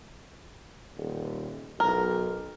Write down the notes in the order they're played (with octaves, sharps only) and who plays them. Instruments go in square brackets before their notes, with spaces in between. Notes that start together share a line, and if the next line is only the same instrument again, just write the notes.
[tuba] D#1
[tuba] B1 [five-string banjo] A#4